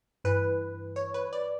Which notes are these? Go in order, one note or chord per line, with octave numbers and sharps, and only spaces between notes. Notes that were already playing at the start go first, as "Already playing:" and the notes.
G2 E3 B4
C#5
B4
D5